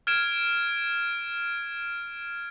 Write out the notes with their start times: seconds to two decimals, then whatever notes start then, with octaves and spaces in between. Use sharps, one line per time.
0.07 F6 G#6 D7 E7